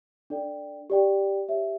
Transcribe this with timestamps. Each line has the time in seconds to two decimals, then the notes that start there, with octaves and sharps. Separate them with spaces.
0.30 D4 A4 D5 G5
0.90 G4 D5 G5
1.49 G4 C#5 E5